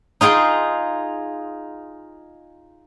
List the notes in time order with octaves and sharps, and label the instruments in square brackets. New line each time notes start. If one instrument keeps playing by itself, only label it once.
[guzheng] D#4 F4 G#4 G5 C6